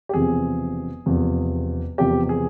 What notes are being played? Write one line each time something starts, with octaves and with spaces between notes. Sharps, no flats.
G4
E1 E2 C3 F3 C4 G#4
E1 E2 C3 F3 C4
E1 E2 C3 F3 C4 G4
G#4